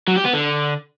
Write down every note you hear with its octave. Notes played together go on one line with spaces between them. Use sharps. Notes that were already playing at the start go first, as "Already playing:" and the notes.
F#3
G4
B3
D3